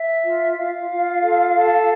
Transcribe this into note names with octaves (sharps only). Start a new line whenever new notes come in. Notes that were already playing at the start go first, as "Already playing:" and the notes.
Already playing: E5
F4
F4 F5
F4
A4
A4